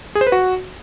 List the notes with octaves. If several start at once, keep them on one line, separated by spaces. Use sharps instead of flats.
G#4
C5
B4
F#4